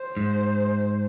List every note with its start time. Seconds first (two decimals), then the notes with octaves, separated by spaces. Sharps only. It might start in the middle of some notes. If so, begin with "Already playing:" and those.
Already playing: C5
0.17 G#2